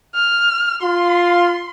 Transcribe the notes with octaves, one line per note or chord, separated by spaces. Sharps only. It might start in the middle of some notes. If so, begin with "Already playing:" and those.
F6
F4 C6